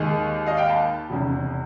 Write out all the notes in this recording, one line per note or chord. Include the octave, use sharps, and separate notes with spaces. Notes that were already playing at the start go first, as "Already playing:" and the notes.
Already playing: D#2 D#3 G#3
D#5 F5
F5 G5
A5 B5
F1 E2 C#3